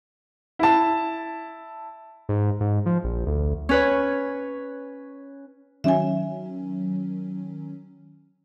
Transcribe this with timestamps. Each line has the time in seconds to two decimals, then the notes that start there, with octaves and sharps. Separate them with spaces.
0.59 E4 A5
2.29 G#2
2.60 G#2
2.86 F3
3.04 A#1
3.26 D2
3.69 C#4 B4 C#5
5.84 D#3 F#3 C#4 E5 G#5